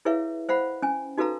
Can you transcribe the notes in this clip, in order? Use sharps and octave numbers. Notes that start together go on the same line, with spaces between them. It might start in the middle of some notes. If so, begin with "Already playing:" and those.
E4 G#4 B4 C#5 E5 F5
C5 F5 F#5 B5
C#4 G#5
D#4 F#4 A4 B4 F5 A#5